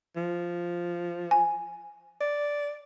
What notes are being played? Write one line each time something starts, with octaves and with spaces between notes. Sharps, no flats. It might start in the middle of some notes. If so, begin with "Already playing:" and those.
F3
G#5
D5